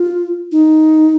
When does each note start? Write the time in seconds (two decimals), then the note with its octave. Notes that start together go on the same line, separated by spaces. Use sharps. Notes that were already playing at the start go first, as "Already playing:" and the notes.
Already playing: F4
0.52 D#4